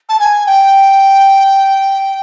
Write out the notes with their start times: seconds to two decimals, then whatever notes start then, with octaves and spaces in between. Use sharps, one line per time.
0.09 A5
0.20 G#5
0.46 G5